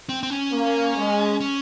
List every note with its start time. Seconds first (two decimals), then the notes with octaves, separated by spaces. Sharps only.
0.09 C4
0.23 C4
0.30 C#4
0.52 A#3
0.96 G#3
1.40 C#4